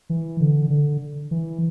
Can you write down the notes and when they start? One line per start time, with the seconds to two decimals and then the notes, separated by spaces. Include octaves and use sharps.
0.10 E3
0.40 D3
0.70 D3
1.31 E3